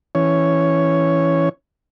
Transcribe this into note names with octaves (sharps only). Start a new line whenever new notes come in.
E3 C#4 C#5